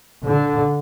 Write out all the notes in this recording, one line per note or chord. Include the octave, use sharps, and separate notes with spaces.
D3